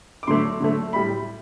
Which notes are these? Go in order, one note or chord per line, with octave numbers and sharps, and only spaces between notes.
D6
D3 F#3 A3 C6
D3 F#3 A3
A2 G3 B5